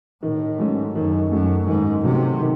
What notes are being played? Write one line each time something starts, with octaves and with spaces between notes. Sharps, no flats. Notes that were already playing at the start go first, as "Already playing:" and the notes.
A2 D#3
G#2 F#3 A3 C#4
F#2 D#3
F#2 F#3 A3 C#4
G#2 D#3
C3 F#3 A3 C#4
D#3